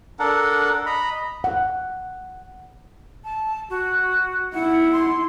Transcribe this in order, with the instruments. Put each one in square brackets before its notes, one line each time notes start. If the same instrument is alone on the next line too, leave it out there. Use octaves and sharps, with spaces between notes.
[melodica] D4 A4 A#4 F#5
D#5 A#5 B5
[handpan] F#5
[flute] A5
F#4
[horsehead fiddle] E4 [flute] F#5
[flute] C6